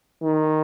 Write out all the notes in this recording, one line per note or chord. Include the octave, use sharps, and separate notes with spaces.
D#3